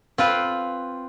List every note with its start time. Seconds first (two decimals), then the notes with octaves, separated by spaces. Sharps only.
0.18 C4 F4 B4